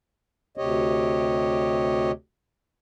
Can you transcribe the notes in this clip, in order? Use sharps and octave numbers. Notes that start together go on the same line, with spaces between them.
D2 C3 G4 C#5 D#5